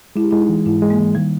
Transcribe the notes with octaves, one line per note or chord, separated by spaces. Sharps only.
G#3 E4
G4
G#3 E4
D#4
E3
G#2 E4
G#3
A#3
E3
D#3 G3